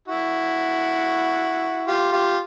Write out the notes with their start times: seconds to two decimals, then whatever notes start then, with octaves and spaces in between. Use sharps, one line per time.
0.08 E4 F#4
1.88 F4 G4
2.12 F4 G4